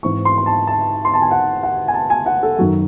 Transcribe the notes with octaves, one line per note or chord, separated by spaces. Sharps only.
G#2 E3 C4 C#6
C6
C6
A5
A5
C6
A5
G#5
F#5
F#5
G#5
A5
G#5
F#5
A4
F#2 D#3 F#3 F#4